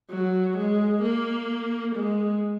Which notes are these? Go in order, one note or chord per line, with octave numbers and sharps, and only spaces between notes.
F#3
G#3
A#3
G#3